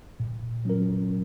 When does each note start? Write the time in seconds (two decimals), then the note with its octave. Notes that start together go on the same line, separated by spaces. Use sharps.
0.20 A#2
0.65 F#3 C#4 F4 A#4